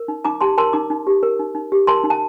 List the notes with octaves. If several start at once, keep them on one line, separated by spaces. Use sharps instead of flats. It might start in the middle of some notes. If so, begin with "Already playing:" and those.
Already playing: A#4
D#4
D#4 A#5 D6
G4 A5 C6
A#4 A5 C6
D#4 A#5 D6
D#4
G4
A#4
D#4
D#4
G4
A#4 A5 C6
D#4
A5